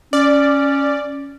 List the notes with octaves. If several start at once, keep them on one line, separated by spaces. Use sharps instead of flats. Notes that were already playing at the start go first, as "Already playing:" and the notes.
C#4 D5